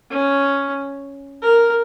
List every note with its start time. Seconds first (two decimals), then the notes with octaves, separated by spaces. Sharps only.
0.11 C#4
1.42 A#4